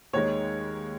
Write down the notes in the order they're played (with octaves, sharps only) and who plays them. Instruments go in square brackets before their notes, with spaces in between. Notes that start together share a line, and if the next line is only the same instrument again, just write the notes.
[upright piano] D#2 D#3 G#3 C#5